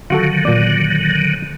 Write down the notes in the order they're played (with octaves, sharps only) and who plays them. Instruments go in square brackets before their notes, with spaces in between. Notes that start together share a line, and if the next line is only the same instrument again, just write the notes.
[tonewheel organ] D3 D#3 F#3 [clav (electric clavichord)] F4 F#4 A4
[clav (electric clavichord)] A#2 D5